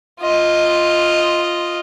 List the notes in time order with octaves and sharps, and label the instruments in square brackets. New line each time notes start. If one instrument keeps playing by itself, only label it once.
[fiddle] F4 D#5